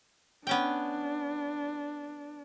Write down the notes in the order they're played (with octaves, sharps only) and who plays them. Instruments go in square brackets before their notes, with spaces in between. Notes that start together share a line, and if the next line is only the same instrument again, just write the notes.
[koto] B3 C#4 G5 [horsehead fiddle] D4